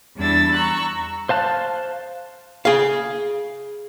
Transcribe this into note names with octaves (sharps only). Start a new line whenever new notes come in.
E2 G3 D4 E4 E6 A6
A#5 C#6 E6 F#6
C5 F5 A5 F#6
G#4 F5